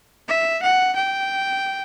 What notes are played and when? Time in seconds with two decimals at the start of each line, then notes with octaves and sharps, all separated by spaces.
0.28 E5
0.63 F#5
0.96 G5